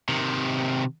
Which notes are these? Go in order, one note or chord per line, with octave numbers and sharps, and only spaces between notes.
C3 D#3